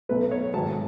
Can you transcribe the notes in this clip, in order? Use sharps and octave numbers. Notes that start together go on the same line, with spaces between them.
B1 B2 A3 B4
C#5
G#1 G#2 F#3 A5